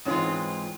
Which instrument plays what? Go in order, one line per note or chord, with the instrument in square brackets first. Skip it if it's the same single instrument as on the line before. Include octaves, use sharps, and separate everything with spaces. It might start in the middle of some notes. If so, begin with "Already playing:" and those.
[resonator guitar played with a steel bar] G#2 E3 G#3 C4 F4 [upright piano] C#4